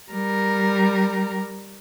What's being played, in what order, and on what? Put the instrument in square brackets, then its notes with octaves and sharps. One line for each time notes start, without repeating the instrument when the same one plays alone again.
[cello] G3 A#4